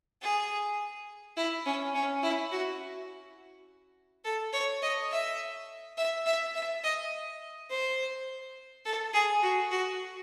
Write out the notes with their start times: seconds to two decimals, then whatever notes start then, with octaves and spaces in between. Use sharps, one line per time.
0.22 G#4
1.36 E4
1.65 C#4
1.95 C#4
2.23 E4
2.51 F#4
4.24 A4
4.53 C#5
4.82 D#5
5.11 E5
5.97 E5
6.26 E5
6.55 E5
6.83 D#5
7.70 C5
8.85 A4
9.13 G#4
9.42 F#4
9.71 F#4